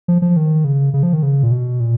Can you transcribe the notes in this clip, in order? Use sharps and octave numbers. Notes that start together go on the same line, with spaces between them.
F3
F3
D#3
C#3
C#3
F3
D#3
C#3
A#2
B2
A#2